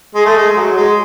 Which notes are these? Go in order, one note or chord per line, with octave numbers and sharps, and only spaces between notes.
G#3
A3
G#3
F#3
G#3